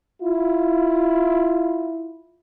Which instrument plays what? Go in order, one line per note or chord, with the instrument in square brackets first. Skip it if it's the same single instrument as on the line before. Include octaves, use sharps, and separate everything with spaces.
[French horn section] E4 F4